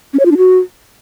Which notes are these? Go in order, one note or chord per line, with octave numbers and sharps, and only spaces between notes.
C#4
C#5
F4
D4
F#4